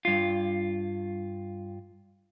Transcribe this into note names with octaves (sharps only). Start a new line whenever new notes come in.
G2 F4